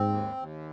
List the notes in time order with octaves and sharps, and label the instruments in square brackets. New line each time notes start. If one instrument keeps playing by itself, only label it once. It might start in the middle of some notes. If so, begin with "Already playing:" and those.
Already playing: [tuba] G#2 [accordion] C4
[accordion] D#2
D#2